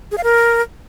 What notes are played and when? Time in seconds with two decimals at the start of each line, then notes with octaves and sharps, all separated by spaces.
0.12 G#4
0.18 F5
0.24 A#4